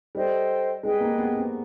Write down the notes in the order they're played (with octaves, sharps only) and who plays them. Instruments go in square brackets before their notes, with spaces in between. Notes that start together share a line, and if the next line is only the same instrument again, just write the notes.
[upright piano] G3 [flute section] A4 C5 D#5 G5
[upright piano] G#3 [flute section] G#4 B4 D#5 G5
[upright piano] A#3
B3
C4